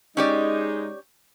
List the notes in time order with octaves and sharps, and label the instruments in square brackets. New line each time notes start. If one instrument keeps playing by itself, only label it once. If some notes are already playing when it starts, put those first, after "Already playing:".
[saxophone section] G#3 D#4 [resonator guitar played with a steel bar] C#4 G4 D5